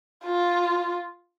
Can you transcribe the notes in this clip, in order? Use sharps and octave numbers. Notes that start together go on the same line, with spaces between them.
F4